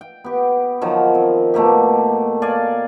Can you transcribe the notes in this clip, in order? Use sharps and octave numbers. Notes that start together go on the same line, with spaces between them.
G5
B3 G4
D#3 F3 F#3
C4
B2 A3 A#3 G4
D5 F5 G#5